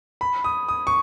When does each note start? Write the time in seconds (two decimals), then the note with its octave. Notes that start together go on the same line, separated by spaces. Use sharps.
0.21 B5
0.44 D#6
0.68 D#6
0.87 C#6